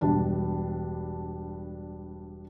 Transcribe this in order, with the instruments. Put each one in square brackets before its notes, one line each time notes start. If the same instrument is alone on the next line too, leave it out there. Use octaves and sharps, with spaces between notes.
[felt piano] E1 G2 D4